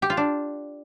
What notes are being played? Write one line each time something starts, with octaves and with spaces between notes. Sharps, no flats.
G4
F4
D4